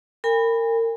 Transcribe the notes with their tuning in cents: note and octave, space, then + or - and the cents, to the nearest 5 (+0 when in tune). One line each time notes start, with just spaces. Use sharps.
A#4 -30 G#5 -45 B5 +0